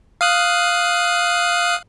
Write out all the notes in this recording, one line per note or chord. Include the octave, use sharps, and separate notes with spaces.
F5 D#6 F#6